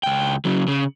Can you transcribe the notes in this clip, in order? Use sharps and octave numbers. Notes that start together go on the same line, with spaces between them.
C#2 G5
C#3 F#3
C#3